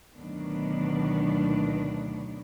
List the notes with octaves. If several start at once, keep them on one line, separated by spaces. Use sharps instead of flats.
D2 B2 D#3 F#3 B3 D4